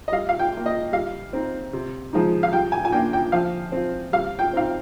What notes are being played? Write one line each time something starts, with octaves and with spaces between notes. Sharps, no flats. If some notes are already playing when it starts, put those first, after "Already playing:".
D#5
G3 F5
F5
G5
A#3 F4
D#5
G3 F5
C4 D#4
C3
F3 G#3 D#4
F5
G3 G5
G#5
G#5
A#3 D4 F4 G5
G5
F3 F5
C4 F4
G3 F5
G5
C4 D#4 F5